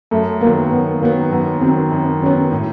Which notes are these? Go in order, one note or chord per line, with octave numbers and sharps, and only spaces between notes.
F#2 A3
D#3 F#3 A#3 B3
F#2 B3
D#3 F#3 A#3 B3
F#2 B3
D#3 F#3 B3 C4
F#2 C4
D#3 F#3 B3 C#4
A2